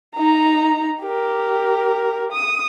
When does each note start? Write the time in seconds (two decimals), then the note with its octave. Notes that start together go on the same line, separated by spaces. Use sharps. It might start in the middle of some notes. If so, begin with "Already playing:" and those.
0.16 D#4 A#5
1.02 G4 A#4
2.32 D#6